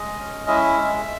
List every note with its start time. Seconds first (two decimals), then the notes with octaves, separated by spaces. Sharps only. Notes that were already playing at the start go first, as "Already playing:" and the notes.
Already playing: G#3 D#5
0.19 C#4
0.48 E4 E5
0.76 G#3